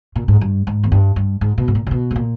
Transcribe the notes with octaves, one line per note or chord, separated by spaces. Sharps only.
A#2
G#2
G2
G#2
E2
G2
G2
G#2
B2
G#2
A#2
C#3
B2
G#2
A#2